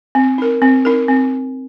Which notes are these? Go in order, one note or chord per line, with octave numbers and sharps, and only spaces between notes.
C4
D#4 A#4
C4
D#4 A#4
C4